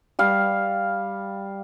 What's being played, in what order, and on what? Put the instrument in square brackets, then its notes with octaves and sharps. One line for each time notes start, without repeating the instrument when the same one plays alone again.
[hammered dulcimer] G3 F5